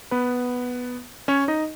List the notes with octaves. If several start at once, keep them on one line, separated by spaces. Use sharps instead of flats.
B3 B4
C#4 C#5
D#4 D#5